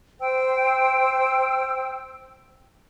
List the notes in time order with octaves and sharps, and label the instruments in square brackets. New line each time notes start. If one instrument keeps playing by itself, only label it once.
[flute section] C5 G5 E6